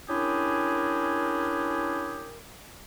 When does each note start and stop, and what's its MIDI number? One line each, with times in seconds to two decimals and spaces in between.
0.10 2.35 61
0.10 2.35 62
0.10 2.35 64
0.10 2.35 67
0.10 2.35 68
0.10 2.35 70